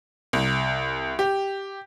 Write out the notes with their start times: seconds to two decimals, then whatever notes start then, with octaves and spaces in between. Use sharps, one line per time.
0.33 C2
1.19 G4